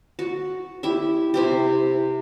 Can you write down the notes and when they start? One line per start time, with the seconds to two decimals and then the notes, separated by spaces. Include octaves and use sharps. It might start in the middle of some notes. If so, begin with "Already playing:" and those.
0.19 F#4
0.83 E4 G4 E5
1.34 C3 E4 G4